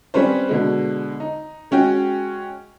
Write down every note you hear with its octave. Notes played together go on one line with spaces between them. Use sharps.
G3 C4 C#4 B4 C5
B2 D3 G#3
D#4
G#3 C#4 F#4 G5